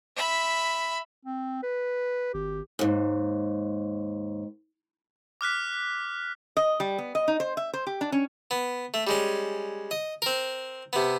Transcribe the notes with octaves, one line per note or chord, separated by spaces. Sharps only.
E5 B5
C4
B4
G#1 G4
D#2 G#2
D6 F6 F#6 B6
D#5
G3
B3
D#5
D#4
C5
E5
C5
G4
D4
C#4
B3
A3
G3 G#3 C#4
D#5
C4 A#4
C3 B3